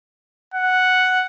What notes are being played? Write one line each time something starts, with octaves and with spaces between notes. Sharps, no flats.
F#5